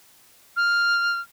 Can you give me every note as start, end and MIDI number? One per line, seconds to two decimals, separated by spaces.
0.56 1.19 89